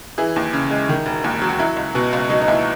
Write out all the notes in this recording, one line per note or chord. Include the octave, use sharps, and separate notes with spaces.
E3 E4 G#4
D#2
C#3
G#3
D#3
E1
D#2
F#3
F#4
F#3 E4
C#2
B2
C#2
F#3 D#4
D#4
D#2 E4